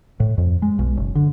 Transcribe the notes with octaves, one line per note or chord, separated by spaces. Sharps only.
A2
F2
G#3
B1
F#1
D3